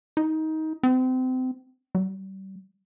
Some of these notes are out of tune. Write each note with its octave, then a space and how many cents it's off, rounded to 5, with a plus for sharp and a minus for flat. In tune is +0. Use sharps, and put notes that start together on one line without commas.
D#4 +20
C4 -30
G3 -35